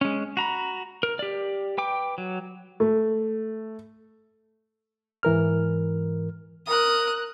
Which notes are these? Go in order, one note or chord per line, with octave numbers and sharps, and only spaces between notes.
G#3 C#4
F#4 A#5 B5
A#4
G4 D5
B4 G5 D6
F#3
A3
G#2 E3 A#4 F6
A#4 D#6 F#6